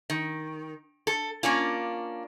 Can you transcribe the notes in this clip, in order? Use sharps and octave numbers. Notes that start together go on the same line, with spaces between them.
D#3
A4
A#3 C#4 D4 F4